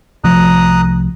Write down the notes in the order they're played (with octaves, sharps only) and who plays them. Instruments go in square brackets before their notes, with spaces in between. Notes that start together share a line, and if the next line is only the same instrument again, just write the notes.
[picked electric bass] C2 F3 A3 [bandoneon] A#5 D#6 F#6